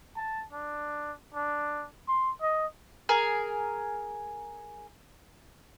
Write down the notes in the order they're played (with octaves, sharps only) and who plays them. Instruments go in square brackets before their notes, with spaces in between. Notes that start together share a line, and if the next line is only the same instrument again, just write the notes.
[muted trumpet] A5
D4
D4
C6
D#5
[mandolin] G#4 A#4 G#5